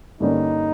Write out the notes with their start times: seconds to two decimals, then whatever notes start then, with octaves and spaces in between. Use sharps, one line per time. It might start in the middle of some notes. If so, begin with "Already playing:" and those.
0.20 G2 D3 G3 A#3 C#4 D#4